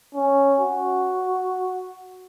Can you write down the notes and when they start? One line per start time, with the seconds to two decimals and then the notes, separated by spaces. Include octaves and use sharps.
0.15 C#4
0.60 F#4